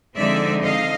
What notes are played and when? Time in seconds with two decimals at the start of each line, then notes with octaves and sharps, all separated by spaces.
0.16 D3 F3 G#3 C4 D#4 D5 E5
0.63 D#5 F5